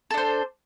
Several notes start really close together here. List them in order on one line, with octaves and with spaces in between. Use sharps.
A4 D4 C5